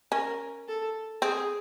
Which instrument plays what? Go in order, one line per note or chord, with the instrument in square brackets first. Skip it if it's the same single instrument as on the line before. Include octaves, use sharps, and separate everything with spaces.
[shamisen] C#4 [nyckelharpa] A#4
[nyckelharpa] A4
[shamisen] C4 [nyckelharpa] G#4